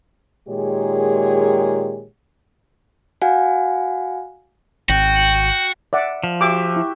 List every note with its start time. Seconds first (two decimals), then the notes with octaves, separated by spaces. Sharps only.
0.49 A#2 D#3 G#3 G4 G#4 C#5
3.22 F#4 F5 F#5 G#5
4.89 G#1 F#4 G5
5.93 D5 E5 F#5
6.24 F3
6.41 F#4 G4 E5 D6
6.76 E4